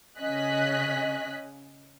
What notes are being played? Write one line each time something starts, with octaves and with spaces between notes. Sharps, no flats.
C#3 C#4 D#5 G#5 F#6 B6